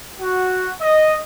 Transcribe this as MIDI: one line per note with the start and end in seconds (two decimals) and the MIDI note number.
0.19 0.70 66
0.79 1.17 75